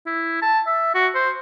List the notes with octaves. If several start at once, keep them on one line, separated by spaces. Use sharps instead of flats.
E4
A5
E5
F#4
C5